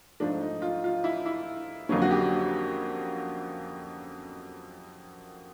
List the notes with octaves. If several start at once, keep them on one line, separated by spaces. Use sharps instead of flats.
G#2 F3 A3 D4
D#4
F4
F4
E4
E4
F2 D3 F#3 A#3 C#4
F#4
G4